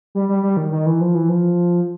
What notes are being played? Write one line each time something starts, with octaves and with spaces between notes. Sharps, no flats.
G3
G3
G3
D#3
D#3
E3
F3
E3
F3